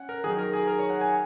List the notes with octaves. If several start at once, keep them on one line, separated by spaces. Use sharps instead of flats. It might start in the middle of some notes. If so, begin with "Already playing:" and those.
Already playing: C#4 F#5
A#4
D#3 F#3 D#4 G#4
A#4
G#4
A#4
C#5
F#5
G#5